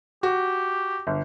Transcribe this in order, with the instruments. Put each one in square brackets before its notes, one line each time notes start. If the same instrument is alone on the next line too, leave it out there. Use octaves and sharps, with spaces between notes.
[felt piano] F#4 [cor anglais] G4
[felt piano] G1